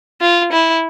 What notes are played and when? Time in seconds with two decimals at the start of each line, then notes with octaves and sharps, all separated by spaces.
0.21 F4
0.52 E4